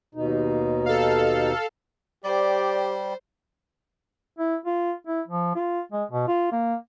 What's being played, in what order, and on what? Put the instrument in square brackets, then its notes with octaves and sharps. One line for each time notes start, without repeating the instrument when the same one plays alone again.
[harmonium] D#2 B2 D#4
[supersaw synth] A4 F5
[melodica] G3 [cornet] G4 [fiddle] C5 [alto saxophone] D5
[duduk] E4
F4
E4
F3
F4
G#3
B2
F4
A#3